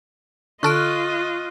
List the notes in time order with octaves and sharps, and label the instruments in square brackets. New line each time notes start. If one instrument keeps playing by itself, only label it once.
[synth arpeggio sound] D3 A4 D7 [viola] F4 D#5 [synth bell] C#6 F6 F#6